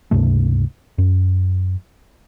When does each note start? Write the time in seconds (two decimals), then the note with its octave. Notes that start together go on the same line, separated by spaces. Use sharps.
0.11 C#2 G2 C3 A3
0.98 F#2